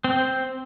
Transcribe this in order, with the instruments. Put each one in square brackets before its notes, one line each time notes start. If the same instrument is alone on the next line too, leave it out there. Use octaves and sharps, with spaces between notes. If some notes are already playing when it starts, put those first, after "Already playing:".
[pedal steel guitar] C4